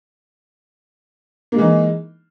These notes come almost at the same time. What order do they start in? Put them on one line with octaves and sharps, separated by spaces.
A#3 G#3 E3 D#4